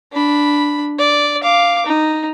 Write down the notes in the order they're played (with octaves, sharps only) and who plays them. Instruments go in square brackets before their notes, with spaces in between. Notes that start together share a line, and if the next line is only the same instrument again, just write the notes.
[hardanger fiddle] D4 B5
D5
F5 D6
D#4